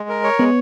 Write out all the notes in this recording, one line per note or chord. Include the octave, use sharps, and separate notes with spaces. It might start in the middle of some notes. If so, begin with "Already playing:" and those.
Already playing: G#3
A#4
C#5
G#3 B3